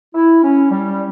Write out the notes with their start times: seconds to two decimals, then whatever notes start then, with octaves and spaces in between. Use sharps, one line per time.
0.15 E4
0.43 C#4
0.71 G3